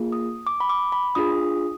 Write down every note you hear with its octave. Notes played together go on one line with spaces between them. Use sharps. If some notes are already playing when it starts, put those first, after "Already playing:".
Already playing: A#3 F4 G#4
D#6
D6
B5
D6
B5
D4 F4 G#4 D#6